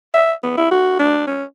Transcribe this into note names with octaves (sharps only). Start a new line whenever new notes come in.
E5
B3
E4
F#4
D4
C#4